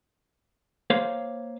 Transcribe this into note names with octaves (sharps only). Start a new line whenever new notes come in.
A#3 C5 C#5 F5